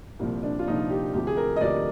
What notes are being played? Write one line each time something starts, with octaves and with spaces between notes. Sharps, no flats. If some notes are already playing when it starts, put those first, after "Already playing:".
C2 A#2 F3
D4
F4
C2 A#2 F3 D#4
G4
D2 C3 F3 G4
G#4
A#4
D#5
D2 C3 F3 D5